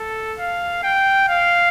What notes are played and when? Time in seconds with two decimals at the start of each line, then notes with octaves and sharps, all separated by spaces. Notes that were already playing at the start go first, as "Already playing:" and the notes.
Already playing: A4
0.39 F5
0.83 G5
1.28 F5